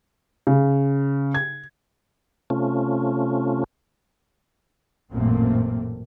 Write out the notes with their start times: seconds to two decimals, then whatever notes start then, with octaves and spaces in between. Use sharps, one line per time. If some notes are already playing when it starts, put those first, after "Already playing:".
0.47 C#3
1.34 G#6
2.50 C3 A3 C#4 F4
5.12 A1 F#2 A#2 A3 A#3 C4